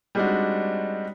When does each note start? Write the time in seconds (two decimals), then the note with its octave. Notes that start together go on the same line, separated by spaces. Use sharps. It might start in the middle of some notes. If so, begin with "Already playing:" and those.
0.15 G3 G#3 C4 D4 D#4 F#4